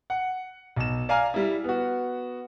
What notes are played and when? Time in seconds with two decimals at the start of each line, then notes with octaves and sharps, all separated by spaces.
0.10 F#5
0.76 B1 E7
1.09 D5 F5 G#5 A#5 F6
1.34 G3 E4
1.64 B3 F#4